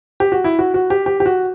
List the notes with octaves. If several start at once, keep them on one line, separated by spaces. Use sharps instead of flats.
G4
F#4
E4
F#4
F#4
G4
G4
G4
F#4